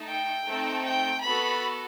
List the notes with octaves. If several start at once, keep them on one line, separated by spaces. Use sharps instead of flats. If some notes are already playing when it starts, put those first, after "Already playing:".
Already playing: A3 D#4 A4
G5
A3 C4 D#4 A4
G5
B3 F#4 A4 B5